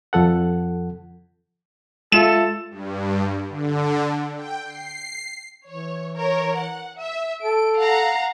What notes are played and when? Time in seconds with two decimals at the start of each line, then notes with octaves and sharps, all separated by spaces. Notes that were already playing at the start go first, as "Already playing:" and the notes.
0.13 F2 F3 A4 F#5
2.12 G#3 F4 A4 E5 E7
2.70 G2
3.50 D3
4.35 G5
4.65 C7
5.67 E3 C#5
6.16 A#4 C#5
6.57 F#5
6.99 E5
7.42 A4 D7
7.78 F5 F#5 A#5